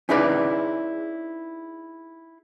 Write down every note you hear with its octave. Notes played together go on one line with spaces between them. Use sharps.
C#4 D#4 E4 G#4 B4 D5